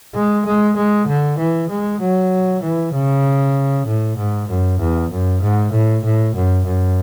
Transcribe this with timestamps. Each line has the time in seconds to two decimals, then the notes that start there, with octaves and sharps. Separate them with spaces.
0.15 G#3
0.46 G#3
0.77 G#3
1.07 D3
1.39 E3
1.70 G#3
2.01 F#3
2.63 E3
2.94 C#3
3.87 A2
4.18 G#2
4.49 F#2
4.80 E2
5.11 F#2
5.42 G#2
5.72 A2
6.04 A2
6.35 F#2
6.66 F#2